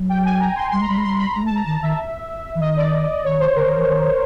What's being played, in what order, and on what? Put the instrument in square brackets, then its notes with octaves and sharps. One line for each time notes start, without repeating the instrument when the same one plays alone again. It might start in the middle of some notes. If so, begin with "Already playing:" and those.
Already playing: [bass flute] F#3
[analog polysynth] G5
G#5
A#5
C6
[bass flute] G3 [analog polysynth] C6
[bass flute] G#3 [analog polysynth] A#5
[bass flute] G3 [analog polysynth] B5
[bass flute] G#3
[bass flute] G3 [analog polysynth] C6
[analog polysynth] B5
[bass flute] G#3 [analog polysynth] A#5
[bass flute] A3
[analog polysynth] A5
[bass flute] G#3 [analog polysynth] A#5
[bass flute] D#3 [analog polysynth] A5
[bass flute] D#3 [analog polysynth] E5
[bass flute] E3
[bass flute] D#3 [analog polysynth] D#5
[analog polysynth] D5
[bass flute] D#3 [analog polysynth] C#5
[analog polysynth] C5
[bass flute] D3 [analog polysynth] A#4
[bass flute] D#3
E3
D#3